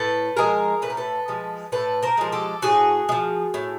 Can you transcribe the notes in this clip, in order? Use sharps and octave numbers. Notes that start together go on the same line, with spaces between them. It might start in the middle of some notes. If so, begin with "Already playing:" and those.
Already playing: A2 A4 B4
F3 G#3 G#4 A#4
A2 B4
A#4
A4 B4
F3 G#3
A2 A4 B4
A#4 C5
F3 G#3
G4 A4
A2 F#4 G#4
G#3
F3
A2